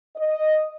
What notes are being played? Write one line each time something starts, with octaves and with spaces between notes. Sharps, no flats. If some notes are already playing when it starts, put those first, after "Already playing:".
D#5